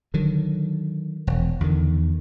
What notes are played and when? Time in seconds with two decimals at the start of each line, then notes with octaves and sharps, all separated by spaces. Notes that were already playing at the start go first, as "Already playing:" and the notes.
0.14 D3 D#3 F#3
1.27 E1
1.61 E2 D3 D#3